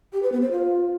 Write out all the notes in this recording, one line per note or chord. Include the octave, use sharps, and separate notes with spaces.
G4
B4
B3
C5
F4